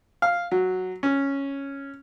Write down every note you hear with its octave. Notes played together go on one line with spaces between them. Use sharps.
F5
F#3
C#4